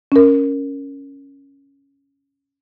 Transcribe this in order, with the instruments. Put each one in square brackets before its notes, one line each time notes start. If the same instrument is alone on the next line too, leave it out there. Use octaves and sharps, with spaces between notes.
[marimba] C#4 A#4